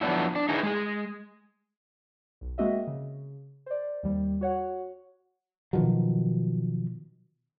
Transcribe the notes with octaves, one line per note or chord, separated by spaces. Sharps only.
F3 F#3 B3 C#4 D4 E4
D4
D#4 E4 G#4 B4
G#3 G#4
B1
G#3 A#3 C4 F#4 D#5 E5
C#3
C5 D5
D#2 G3
F#4 C#5 F#5
B2 D#3 F3 F#3